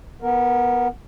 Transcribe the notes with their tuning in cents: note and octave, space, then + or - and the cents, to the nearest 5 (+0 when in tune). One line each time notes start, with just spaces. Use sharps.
B3 -15 A#4 +0